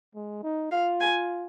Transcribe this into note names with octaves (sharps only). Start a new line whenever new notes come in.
G#3
D#4
F4 F5
G#5